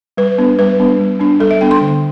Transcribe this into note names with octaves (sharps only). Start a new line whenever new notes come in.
G3 B4
B3 D4
G3 B4
B3 D4
G3
B3 D4
G3 A4
E5
B3 D4 G5
C6
D3